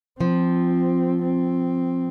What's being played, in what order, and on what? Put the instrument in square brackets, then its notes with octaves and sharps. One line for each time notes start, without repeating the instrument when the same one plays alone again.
[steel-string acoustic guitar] F3 [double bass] C4
[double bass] C4